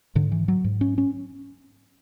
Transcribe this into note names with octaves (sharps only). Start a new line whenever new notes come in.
G#2 D3
E3
F#3
G#2
C#4
C#4